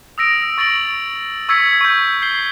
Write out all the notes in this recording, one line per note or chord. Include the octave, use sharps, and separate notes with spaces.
D#6 E6 A#6 D7
C#6 A6 A#6 D7 F#7
C#6 E6 G#6 B6 C#7
C#6 G6
G6 C7 G7